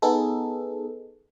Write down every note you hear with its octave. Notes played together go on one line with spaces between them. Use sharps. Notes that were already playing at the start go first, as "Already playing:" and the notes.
B3 D#4 G#4 A4